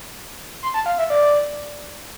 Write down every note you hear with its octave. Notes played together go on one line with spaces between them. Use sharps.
C6
A5
F5
E5
D5